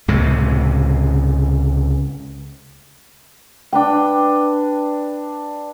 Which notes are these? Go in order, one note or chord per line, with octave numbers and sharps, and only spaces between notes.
C#2 A2 C3
D4 B4 G5